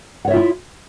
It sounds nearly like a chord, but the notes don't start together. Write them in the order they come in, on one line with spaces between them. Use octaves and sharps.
F#5 C#5 E5 F4 E4